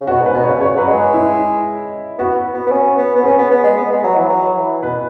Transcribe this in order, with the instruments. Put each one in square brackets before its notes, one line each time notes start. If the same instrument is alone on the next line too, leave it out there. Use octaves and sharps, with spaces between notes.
[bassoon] C#3
[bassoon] B2 [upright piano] F#4
[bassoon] G#2
[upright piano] B4
[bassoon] B2
[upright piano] C#5
[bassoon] C#3
[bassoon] C#3 [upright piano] C#5
[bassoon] F#3 [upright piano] B4
[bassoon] G#3
[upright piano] G#4
E4
[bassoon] B3 [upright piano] F#4
[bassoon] B3
B3
C#4
B3
B3
[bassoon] C#4 [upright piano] G#4
[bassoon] B3
B3
G#3
B3
G#3
F#3
E3
F#3
E3
[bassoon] B2 [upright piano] B4